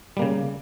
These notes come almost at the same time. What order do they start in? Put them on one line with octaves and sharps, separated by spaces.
G3 A#3 C#3